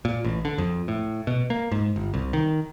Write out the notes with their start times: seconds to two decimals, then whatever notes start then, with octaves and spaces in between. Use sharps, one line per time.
0.05 A#2
0.25 A1
0.45 D3
0.58 F2
0.88 A2
1.27 B2
1.50 A#3
1.72 G#2
1.96 G1
2.14 C2
2.33 D#3